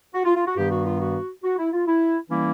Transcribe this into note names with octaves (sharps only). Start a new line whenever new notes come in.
F#4
F4
F4
F#4
G2 D#3 G3 B3 G4
F#4
F4
F#4
F#4
E4
F4
E4
E3 G3 A#3 C#4 E4